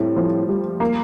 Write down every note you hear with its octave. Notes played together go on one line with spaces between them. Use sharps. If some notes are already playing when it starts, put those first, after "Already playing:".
Already playing: A2 G3 A3 C4
F3
G3
A#3